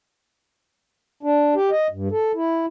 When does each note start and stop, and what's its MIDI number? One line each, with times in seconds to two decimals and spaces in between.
1.23 1.54 62
1.55 1.70 67
1.71 1.87 75
1.92 2.08 43
2.11 2.32 69
2.35 2.66 64